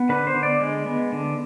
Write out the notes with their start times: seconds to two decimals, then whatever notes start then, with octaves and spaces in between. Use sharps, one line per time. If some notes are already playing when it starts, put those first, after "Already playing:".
Already playing: B3
0.09 D3 B4
0.27 C5
0.35 D3
0.43 D5
0.61 G#3
0.86 B3
1.12 D3